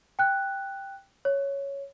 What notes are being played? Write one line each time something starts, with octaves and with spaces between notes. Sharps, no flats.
G5 F#6
C#5